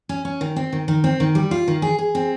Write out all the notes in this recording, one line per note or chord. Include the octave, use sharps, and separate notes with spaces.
C#4
C#4
D#3
C4
D#3
D#3
C4
D#3
G3
F4
D#3
G#4
G#4
C4